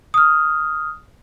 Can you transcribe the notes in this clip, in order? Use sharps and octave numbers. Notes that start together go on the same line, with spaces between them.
D#6 F6